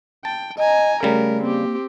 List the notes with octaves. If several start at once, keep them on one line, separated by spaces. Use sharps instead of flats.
G5 A5
D#5 G#5 A#5
C#3 G3 A3 A#4
A#3 C4 G4